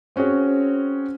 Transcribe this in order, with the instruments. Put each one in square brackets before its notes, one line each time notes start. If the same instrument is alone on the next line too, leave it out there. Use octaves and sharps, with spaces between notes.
[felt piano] C4 C#4 F#4 G#4 C#5